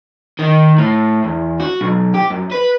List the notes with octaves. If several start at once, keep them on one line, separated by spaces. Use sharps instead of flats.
D#3
A2
E2
F#4
B1
G4
F#2
B4